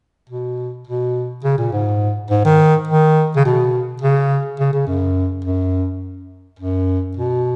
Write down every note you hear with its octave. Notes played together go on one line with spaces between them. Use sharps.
B2
B2
C#3
A#2
G#2
G#2
D#3
D#3
C#3
B2
C#3
C#3
C#3
F#2
F#2
F#2
B2